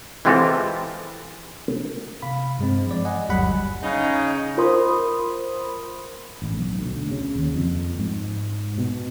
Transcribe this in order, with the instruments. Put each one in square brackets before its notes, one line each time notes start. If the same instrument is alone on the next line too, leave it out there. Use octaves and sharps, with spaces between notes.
[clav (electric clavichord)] E3 G#3 C4 F4 G4 A4
[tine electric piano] C3 F5 B5
G2 G#3 C4
F3 D5
D#5 F#5 G#5
G1 D#2 F#3 G3 F#5 B5
[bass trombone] C#3 [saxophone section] D#4
[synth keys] F4 A#4 C5 B5 C6 D#6
[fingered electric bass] A1
B1
D2
C#3
D#2
F2
G#2
B2